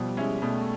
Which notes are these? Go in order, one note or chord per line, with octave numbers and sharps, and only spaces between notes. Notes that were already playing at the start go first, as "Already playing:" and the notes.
Already playing: B2 F3 G3
G#3 C#4 E4
B2 G3 A3